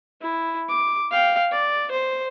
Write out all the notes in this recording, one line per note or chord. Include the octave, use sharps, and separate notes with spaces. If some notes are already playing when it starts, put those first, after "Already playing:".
E4
D6
F5 G5
D5
C5